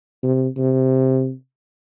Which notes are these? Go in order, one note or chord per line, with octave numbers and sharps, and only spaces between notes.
C3
C3